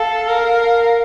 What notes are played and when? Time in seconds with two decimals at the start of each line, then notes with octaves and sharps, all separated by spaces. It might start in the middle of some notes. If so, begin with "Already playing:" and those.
Already playing: A4 F5
0.28 A#4